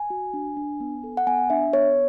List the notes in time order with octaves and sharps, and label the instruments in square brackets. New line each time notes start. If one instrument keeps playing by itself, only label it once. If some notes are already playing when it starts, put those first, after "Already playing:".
Already playing: [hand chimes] G#5
F#4
D4
D4
B3
A4
F#5
B3 G#5
D4 E5
B3 C#5